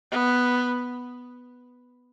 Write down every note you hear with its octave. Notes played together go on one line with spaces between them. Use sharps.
B3